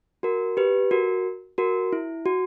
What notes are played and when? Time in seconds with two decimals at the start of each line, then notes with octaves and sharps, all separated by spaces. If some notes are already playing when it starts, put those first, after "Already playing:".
0.23 F#4 A#4
0.57 G4 B4
0.91 F#4 A#4
1.58 F#4 A#4
1.93 E4
2.26 F#4